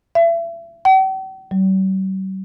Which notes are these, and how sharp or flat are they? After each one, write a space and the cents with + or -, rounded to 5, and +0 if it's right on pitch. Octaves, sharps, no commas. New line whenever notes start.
E5 +35
G5 -45
G3 -45